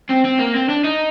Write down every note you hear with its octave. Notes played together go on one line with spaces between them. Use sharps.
C4
C4
A#3
C4
D4
D#4